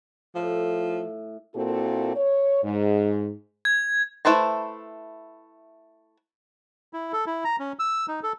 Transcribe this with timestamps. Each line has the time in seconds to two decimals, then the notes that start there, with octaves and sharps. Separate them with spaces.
0.35 A2 F3
1.55 A#2 A#3 C4 E4 F#4 A4
2.15 C#5
2.63 G#2
3.65 G#6
4.25 A3 E4 B4 C5 A5
6.93 E4
7.13 A4
7.27 E4
7.45 A#5
7.60 C#4
7.79 E6
8.08 D#4
8.23 A4